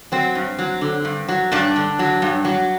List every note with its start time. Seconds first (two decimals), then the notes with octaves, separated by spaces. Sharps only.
0.12 F#3 C4
0.35 G2
0.59 F#3
0.81 D3
1.05 G2
1.28 F#3
1.52 G2 D4
1.76 D3
1.99 F#3
2.22 G2
2.45 F#3